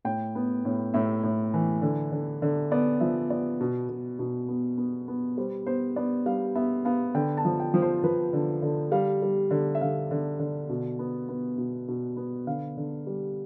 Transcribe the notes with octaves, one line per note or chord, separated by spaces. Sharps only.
A2 G5
B3
A2
A2 E5
A2
E3
D3
D3
D3
B3 D5
F3 E5
B3 D5
B2
B2
B2
B3
B3
B3
G3 C5
B3 C5
B3 D5
G3 F5
B3 E5
B3 F5
D3 G5
A5
F3
G5
F3
C5
F3 B4
D3
D3
G3 F5
G3
D3
E5
D3 F5
D3
D3
B2
B3
B3
B2
B2
B3
D3 F5
D3
G3